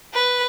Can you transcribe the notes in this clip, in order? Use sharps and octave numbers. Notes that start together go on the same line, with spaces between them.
B4